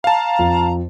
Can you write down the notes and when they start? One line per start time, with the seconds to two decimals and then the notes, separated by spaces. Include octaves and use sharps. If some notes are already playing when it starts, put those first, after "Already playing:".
0.04 F5 A5 A#5
0.39 F2